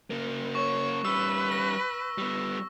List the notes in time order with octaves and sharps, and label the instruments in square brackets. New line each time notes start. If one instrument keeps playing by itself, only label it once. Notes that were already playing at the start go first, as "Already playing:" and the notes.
[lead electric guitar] C#3 A#3
[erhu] C#5 [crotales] C#6
[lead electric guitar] G3 C#4 [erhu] B4 [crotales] E6
[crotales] A#6
[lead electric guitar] G3 B3